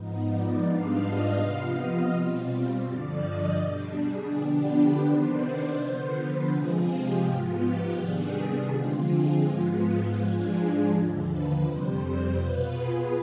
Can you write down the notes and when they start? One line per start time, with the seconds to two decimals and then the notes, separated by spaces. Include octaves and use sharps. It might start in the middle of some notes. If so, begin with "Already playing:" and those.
Already playing: G#2 F3 B3 D#4
0.28 D5
0.65 G#2 G3 B3 D4 F4 F5
1.01 D#5
1.38 C3 F3 B3 F4 F5
1.74 D#5
2.11 B2 G3 C4 F4
2.84 G2 D3 F3 D5
3.21 D#5
3.57 B2 G3 D4
3.95 G#4
4.31 D3 F3 B3 D4 G4
4.68 B4
5.04 C3 D#3 B3 D4 C5
5.41 D5
5.78 D3 F3 B3 C5
6.15 B4
6.51 C3 F3 G#3 C4 F4 G#4
6.88 G4
7.23 G#2 F3 B3 F4
7.60 G4
7.97 C3 D#3 G3 B3 D4 G#4
8.70 D3 F3 G#3 C4 F4
9.06 G#4
9.43 G#2 F3 G#3 B3 F4
10.17 G#2 F3 G#3 D4 F4 G#4
10.53 G#4
10.90 D#2 D3 F3
11.27 B4
11.62 F2 C3 G3 C5
12.00 C5
12.36 B2 B3 F4 B4
12.72 G#4